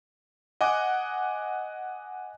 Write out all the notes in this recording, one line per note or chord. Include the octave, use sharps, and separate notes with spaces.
D#5 F#5 G#5 D6